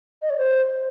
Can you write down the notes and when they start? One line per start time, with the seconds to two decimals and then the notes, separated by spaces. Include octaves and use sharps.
0.22 D#5
0.30 C#5
0.38 C5